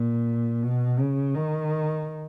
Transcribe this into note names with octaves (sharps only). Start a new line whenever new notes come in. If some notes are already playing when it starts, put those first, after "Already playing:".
Already playing: A#2
B2
C#3
D#3